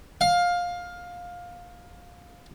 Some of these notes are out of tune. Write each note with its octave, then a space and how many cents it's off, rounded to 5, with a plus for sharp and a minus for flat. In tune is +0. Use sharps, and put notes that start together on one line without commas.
F5 +15